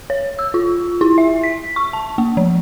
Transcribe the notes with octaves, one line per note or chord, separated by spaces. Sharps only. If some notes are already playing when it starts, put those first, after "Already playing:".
C#5
E6
F4
E4
E5
B6
C#6
A5
A#3
F3